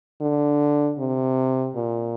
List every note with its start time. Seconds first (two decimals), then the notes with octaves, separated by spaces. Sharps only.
0.21 D3
0.99 C3
1.76 A#2